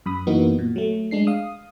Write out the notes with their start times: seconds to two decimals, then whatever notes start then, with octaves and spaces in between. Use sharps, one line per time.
0.06 F#2 B5 D#6
0.27 F#2 E3 A#3 B3 D#4 F#4
0.59 A#2
0.76 F#3 A3
1.11 G#3 D4 C7
1.27 F5 D#6